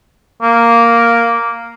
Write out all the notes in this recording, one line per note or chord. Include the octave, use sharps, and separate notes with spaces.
A#3